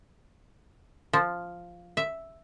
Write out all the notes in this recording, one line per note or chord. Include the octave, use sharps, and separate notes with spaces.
F3
E5